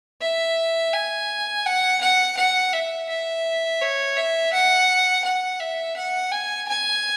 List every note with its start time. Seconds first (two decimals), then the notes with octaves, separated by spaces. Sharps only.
0.21 E5
0.93 G#5
1.66 F#5
2.01 F#5
2.37 F#5
2.73 E5
3.09 E5
3.81 C#5
4.16 E5
4.53 F#5
5.24 F#5
5.60 E5
5.96 F#5
6.32 G#5
6.68 G#5